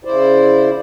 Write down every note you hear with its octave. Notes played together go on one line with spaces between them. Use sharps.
C#3 E4 C5 D5